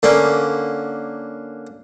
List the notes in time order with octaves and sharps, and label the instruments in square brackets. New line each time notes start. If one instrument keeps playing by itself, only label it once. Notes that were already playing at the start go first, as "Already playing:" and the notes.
[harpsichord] D3 A#3 C#4